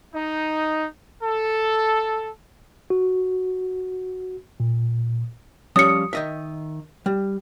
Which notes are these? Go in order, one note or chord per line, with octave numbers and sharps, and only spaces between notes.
D#4
A4
F#4
A#2
F3 G3 C#4 D#6 C#7
D#3 D#5 E5
G3